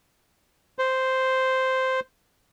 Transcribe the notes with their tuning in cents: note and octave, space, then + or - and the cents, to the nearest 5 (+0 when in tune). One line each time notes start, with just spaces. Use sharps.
C5 -5